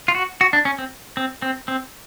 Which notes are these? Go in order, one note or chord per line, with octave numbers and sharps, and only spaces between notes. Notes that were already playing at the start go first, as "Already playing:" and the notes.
F4
F#4
F#4
D4
C#4
C4
C4
C4
C4